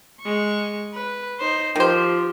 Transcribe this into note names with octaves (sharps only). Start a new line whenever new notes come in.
G#3 C#6
B4
D#4 C5
D#3 F3 G4 C5